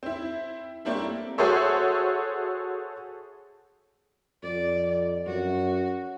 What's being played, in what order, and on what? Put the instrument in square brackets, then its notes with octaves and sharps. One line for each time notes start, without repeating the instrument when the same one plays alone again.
[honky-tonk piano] C4 E4
G3 A3 A#3 C4 D4 E4
F#4 G#4 A4 C5 C#5 E5
[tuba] F2 [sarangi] D5
[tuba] F#2 [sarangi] F#4